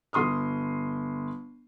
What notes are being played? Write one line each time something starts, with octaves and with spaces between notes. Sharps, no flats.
G1 C6 D#6 F6